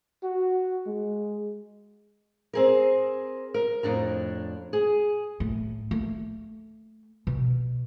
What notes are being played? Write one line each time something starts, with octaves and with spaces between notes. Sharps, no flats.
F#4
G#3
C4 G#4 A#4
A#4
F2 A2 D4 A#5
G#4
A2
A3
B2